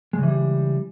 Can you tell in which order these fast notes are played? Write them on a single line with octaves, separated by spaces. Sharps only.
G#3 C#3 E3 G3